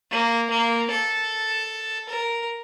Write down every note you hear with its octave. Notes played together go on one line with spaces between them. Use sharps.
A#3
A#3
A4
A#4